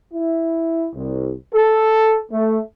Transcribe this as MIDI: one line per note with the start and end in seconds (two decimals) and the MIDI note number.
0.14 0.90 64
0.96 1.33 36
1.54 2.19 69
2.32 2.58 57